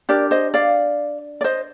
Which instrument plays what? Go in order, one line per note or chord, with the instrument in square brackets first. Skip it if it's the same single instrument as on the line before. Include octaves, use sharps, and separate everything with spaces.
[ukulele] D4 G4 A#4 D5
C5 D#5
D5 F5
D5
C5 D#5